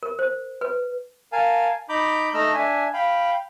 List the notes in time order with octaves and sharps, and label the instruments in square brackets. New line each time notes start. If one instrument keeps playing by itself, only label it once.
[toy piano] A#4
C5
B4
[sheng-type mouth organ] A#4 F5 G#5 A5
D#4 A#5 B5 D6 G6
A3 D#4 D#5 E6 F6
D4 E5 G#5
F5 G5 B5